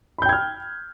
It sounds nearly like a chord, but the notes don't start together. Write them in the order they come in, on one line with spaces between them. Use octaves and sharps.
B5 G6 G5 G#6 F6